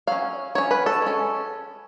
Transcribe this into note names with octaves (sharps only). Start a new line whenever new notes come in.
F#3 C#4 F5
F#3 C#4 C#5
B4
A4
G#3 C#4